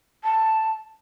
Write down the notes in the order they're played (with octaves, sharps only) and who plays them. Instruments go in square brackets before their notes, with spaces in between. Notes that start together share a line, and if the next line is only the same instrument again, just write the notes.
[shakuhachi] A5